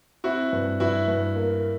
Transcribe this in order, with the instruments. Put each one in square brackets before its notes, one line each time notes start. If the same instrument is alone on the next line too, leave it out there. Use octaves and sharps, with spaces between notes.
[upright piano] C4 [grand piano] E4 F#4
[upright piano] G2
[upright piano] G2 [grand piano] E4 F#4
[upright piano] G2
A#3